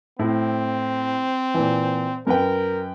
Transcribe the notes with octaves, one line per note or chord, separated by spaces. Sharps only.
A2 C4 E4
A#2 E3
F#2 A#4 B4 G5